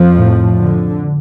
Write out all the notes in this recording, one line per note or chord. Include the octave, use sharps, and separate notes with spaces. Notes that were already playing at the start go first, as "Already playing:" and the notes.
Already playing: F2 F3
A2
D3